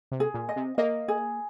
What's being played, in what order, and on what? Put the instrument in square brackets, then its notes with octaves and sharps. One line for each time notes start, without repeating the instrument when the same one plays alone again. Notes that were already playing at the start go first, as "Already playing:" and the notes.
[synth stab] C3
[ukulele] G#4
[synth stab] A#2
[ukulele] D#5
[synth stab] C3
[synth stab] A#3 [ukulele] D#5
[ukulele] G#4